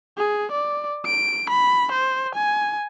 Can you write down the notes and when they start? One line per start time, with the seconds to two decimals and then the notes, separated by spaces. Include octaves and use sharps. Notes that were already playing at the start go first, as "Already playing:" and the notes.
0.18 G#4
0.52 D5
1.06 D7
1.50 B5
1.92 C5
2.35 G#5